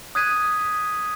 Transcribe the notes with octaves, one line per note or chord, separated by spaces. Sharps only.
D#6 F#6 G#6 B6 D#7